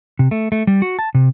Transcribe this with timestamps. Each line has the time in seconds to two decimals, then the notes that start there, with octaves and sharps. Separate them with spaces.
0.19 C3
0.31 A3
0.52 A3
0.67 G3
0.82 F#4
0.99 A5
1.15 C3